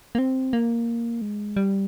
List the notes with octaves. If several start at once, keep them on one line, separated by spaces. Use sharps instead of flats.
A#3
C4
A#3
G#3
G3